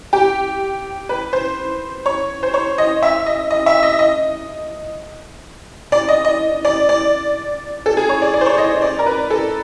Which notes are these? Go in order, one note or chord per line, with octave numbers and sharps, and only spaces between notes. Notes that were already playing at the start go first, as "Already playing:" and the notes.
G4
B4
C5
C#5
C5
C#5
D#5
E5
D#5
D#5
E5
D#5
D#5
D5
D#5
D#5
D5
D5
A4
G#4
C#5
D5
D5
C5
C#5
D#5
D5
A#4
B4
A4